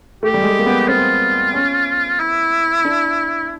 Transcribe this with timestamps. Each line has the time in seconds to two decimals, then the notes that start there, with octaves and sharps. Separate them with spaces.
0.23 A3 G4
0.34 G3
0.42 G#3
0.50 A3
0.59 A#3
0.66 B3
0.88 C4 F4
1.54 C#4
2.20 E4
2.85 D4